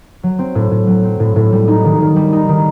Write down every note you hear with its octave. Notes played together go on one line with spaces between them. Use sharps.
F#3
C4
A2
A2
F#3
C4
A2
A2
G3
D#4
D#3
D#3
G3
D#4
D#3